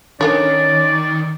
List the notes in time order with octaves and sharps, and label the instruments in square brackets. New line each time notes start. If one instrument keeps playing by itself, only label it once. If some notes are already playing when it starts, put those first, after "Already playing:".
[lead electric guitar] D#3 [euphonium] C#4 [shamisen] D4 A#4 C#5 [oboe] D5